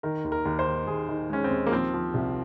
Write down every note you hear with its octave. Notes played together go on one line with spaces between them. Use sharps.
D#3 A#4
D#2
A#4
D#2
C5
D#3
D#2 G#4
D#3
G#3 C#4
C4
D#2
A#3
F3 C4
F3
C2